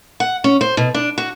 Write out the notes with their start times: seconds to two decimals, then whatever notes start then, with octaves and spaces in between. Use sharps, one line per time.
0.20 F#5
0.44 C#4
0.61 C5
0.77 B2
0.95 D4
1.18 F#4